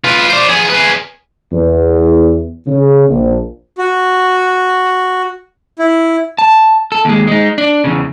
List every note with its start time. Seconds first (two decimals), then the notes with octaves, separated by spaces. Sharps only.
0.04 F4 B4
0.29 C5 D5
0.49 B3 G#4
0.70 G#4 B4
1.52 E2
2.67 C#3
3.09 A#1
3.78 F#4
5.79 E4
6.39 A5
6.92 A4
7.05 D#2 G#3
7.27 G#3 D#4
7.58 D4
7.84 E2 C#3